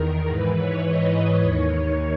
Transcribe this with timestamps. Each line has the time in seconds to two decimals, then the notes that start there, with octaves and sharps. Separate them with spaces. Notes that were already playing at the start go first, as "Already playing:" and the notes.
Already playing: E2 D#3 A#4
0.28 G#2 E3 B4
0.56 C#5
0.84 D#5
1.41 D#2 D#3 C#5